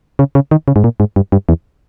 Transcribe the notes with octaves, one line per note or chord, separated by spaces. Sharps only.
C#3
C#3
D#3
C#3
G#2
A#2
G#2
G2
G2
E2